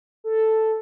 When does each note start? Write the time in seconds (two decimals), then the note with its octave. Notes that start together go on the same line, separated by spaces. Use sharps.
0.24 A4